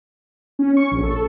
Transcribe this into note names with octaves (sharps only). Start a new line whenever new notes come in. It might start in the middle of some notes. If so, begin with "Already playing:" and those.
C#4
C#6
A#1
A4